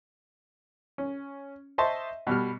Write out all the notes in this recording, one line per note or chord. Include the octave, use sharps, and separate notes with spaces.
C#4
C5 D#5 E5 A5 C6 C#6
B2 G3 F6